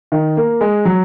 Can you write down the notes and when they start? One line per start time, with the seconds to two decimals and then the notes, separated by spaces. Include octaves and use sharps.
0.12 D#3
0.37 A#3
0.61 G#3
0.85 F#3